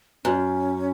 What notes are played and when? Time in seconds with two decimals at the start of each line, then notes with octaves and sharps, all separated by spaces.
0.24 F#2 C#4